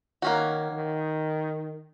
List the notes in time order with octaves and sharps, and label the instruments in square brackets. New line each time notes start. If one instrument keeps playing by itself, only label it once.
[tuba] D#3 [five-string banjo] A#3 C#4 F#4
[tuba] D#3